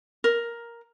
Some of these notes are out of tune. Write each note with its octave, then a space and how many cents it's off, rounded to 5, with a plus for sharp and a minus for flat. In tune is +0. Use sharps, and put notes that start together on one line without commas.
A#4 +5